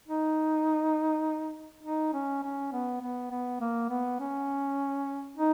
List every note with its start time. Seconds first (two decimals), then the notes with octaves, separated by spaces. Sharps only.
0.08 D#4
1.83 D#4
2.13 C#4
2.43 C#4
2.73 B3
3.01 B3
3.31 B3
3.61 A#3
3.89 B3
4.20 C#4
5.37 D#4